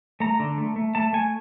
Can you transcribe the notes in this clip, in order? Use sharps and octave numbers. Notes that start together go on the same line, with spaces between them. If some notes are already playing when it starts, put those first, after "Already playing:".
A3 A#5
D3
A3
A3
A3 A5
A3 G#5